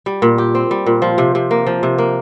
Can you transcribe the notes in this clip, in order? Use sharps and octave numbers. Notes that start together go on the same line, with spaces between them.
G3
A#2
G4
C4
G3
A#2
F3
C3
C3
A#3
F3
C3
A#3